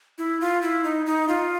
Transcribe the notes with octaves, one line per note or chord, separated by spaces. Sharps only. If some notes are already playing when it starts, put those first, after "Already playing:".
E4
F4
E4
D#4
D#4
F4